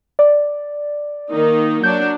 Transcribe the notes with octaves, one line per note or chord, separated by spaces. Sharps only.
D5
D#3 A#3 D#4
F#3 D4 G6